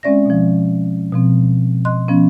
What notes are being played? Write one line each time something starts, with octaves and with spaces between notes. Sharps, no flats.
G#3 C4 C#4 D5 E5 A#6
B2 F3
B2 F3 C4
D#5 C6 F#6
F3 B3 C#4